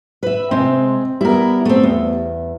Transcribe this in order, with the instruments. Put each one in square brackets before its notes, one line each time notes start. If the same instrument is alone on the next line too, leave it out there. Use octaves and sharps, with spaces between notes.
[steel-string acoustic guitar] B4 E5
[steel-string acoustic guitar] C3 G#3 [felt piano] C4
[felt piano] G3 B3 [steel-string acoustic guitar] E4 A#4
[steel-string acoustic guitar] A3 C4
E2